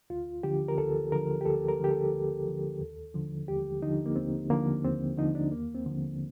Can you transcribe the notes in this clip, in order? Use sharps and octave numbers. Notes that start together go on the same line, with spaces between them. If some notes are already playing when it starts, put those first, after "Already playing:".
D2 F4
D3 F3 G4
A#4
D2 A4
D3 F3 A#4
G4
D2 A4
A#4
D3 F3 G4
A4
D2
D3 F3
D#2
D3 F3
D#2 G4
D3 F3 D#4
A#3
D#2 C4
D3 F3 A#3
D#2 C4
D3 F3 D#4
D4
D#2 A#3
C4
D3 F3